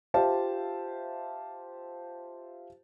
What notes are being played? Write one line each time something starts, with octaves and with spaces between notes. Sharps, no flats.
F4 G4 C5 E5 F5 A5